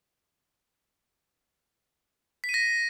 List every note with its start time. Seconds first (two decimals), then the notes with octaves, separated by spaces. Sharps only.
2.44 B6
2.49 D#7
2.54 A#6